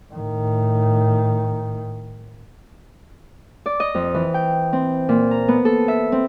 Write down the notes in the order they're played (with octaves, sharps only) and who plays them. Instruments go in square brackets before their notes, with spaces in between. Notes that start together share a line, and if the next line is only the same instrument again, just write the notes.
[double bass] A2 D#3
[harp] D5
D#5
F2
E3
G5
C4
A#2
A#5
B3
A4
E5
C4